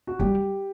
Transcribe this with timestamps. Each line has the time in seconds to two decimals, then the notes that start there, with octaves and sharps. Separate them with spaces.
0.07 F#4
0.19 G3 G4